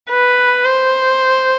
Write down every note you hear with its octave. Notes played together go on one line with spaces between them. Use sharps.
B4
C5